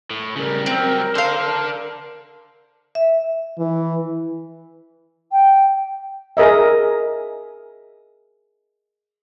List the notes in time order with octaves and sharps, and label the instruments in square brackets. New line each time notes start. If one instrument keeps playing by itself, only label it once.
[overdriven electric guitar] A2
[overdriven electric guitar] C#3 G3 [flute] A#4
[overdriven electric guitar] F#3 G3 [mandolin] C4
[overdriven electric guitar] D4 A4 [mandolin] C5 F5
[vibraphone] E5
[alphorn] E3
[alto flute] G5
[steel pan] G#4 A#4 D#5 E5